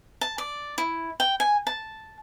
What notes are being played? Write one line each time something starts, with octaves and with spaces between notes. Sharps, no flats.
A5
D5
E4
G5
G#5
A5